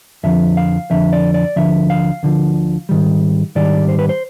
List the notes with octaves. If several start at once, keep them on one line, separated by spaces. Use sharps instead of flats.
F2 D3 F3 E5
F5
F2 D3 F3 E5
D5
D5
D2 D3 F3 E5
F5
D2 D3 F3
G#2 D#3 G3
G#2 D#3 G3 D5
C5
B4
C5